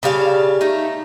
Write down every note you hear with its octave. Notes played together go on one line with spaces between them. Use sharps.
C#3 G3 F5 A5
A3 D#4